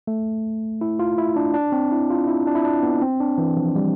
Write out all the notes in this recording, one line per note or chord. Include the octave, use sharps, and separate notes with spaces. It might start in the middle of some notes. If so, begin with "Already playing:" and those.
A3
E4
F4
E4
D4
D4
C4
E4
F4
E4
D4
E4
D4
B3
C4
D4
E3
F3
G3